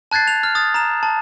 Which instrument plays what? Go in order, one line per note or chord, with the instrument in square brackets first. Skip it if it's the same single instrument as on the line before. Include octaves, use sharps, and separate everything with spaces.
[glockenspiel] A5 F#6 G#6 A6 C7
F7
F6
D#6 A6
A#5 E7
A5